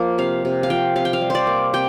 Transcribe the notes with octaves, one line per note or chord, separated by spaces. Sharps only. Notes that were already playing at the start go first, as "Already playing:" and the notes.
Already playing: F3 A#3
C3 F5
C3
F5
F3 G5
C3 F5
G5
F5
G3
C5 D5
A#3
C3 G5